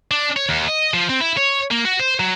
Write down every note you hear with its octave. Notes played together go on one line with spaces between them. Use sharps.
D4
C#5
D#2
D#5
F3
C4
E4
C#5
A#3
F#4
C5
F#3